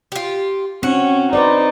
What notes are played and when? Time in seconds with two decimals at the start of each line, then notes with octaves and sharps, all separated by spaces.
0.12 F4 G4
0.83 C4 C#4 F#4
1.33 D#4 B4 C5 D5